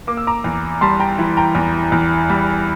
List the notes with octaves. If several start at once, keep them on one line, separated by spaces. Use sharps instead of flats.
A#3 D6
E6
A#5 D6
E2
G3 A5 C6
G5 A#5
E3
G5 A#5
E2
E2
G3